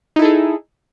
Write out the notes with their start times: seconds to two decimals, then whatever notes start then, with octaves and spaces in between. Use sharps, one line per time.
0.16 D#4
0.19 E4
0.22 A4
0.25 G#4